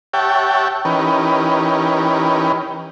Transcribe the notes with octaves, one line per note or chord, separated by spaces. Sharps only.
G4 C#5 E5 F#5 G5 A5
E3 C#4 D#4 G4 A#4 B4